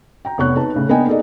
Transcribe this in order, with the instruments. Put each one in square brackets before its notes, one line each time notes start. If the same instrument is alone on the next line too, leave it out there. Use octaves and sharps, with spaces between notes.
[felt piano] G5 A#5
F1 B3 C#5 C#6 F#6
D#4 B4 A5
A2 C#3
A#3 B3 D4 D#5 G5 G#5
A#3 D#4 G#4 A4 D5 D#5